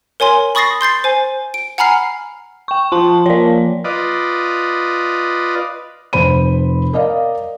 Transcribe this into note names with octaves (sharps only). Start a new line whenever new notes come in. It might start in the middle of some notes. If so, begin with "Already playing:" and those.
A#4 C#5 G#5 C6
B5 C#6 D#6 A6 A#6 C7
C6 G6 A6 C7
C5 G#5
D7
F#5 G#5 A#5 B5 F6 C7
G5 C#6
F3 A5 C6
F3 A#3 C#5 D5
F4 B4 D5 D#5
F1 C5 B5 D#7
A#4 D5 D#5 F5